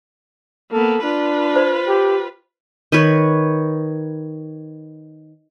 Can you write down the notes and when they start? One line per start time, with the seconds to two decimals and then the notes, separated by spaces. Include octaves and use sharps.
0.73 A#3 B3 A4
1.03 D4 F4 B4
1.56 C5 D5
1.88 G4
2.92 D#3 B4 C#5